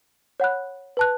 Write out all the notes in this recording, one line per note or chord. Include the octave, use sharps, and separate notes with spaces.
C#5 F#5 B5 F#6
B4 A5 F#6